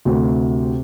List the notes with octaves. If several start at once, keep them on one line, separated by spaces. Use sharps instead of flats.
D2 C3